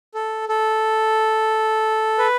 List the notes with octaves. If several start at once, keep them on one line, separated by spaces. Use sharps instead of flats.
A4
A4
B4